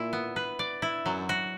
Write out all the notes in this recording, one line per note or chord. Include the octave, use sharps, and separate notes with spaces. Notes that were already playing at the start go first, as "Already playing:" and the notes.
Already playing: A#2 E4
B3
B4
D5
E4
F#2 F#3
F#4